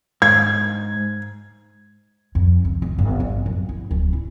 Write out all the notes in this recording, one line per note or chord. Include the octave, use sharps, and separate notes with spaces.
G#2 G#6
F2
C#2
E1
G1
A1
F#1
E4
D1
E4